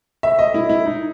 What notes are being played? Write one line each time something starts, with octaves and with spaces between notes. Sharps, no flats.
E5
D#5
E4
E4
D#4